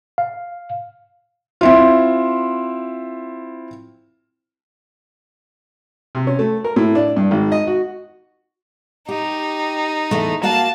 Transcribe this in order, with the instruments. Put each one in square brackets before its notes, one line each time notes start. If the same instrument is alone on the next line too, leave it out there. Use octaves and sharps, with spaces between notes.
[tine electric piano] F5
[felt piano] C4 E4 F4
[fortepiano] C3
C#4
A3
A#4
A2
D4
G2
G#1
D#5
F#4
[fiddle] D#4 [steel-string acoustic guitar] G4
[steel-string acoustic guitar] E2 E3 A3
[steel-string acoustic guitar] A#3 F#4 F5 [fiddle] A5